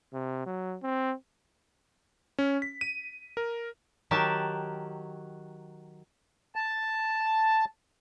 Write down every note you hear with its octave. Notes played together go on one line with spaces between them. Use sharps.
C3
F#3
C4
C#4
B6
D#7
A#4
D#3 F#3 G4 A5
A5